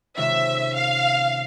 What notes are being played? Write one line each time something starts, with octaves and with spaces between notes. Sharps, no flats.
C3 D#3 G#3 C#4 F4 E5
F5